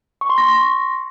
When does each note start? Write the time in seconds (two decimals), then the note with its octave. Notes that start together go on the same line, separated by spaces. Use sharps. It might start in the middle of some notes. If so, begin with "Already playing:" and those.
0.21 C#6
0.30 C6
0.38 A#6